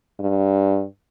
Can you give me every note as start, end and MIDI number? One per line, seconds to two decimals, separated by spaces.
0.19 0.84 43